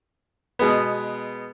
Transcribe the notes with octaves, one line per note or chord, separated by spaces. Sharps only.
B2 G#3 B3